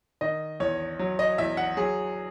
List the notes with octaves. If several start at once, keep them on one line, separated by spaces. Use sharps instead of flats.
D#3 D#5
E2 C#5
F#3
D#5
E2 E5
F#5
F#3 G#4